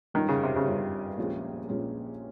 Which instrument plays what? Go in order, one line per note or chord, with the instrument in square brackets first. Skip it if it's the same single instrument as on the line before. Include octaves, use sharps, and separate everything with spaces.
[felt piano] G1 G2 G3 C#4 F4 [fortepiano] D#3
[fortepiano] C#3
C3
C#3
[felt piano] G1 G2 G3 C#4 F4
A#1 A#2 G#3 C#4 G#4
A#1 A#2 G#3 C#4 G#4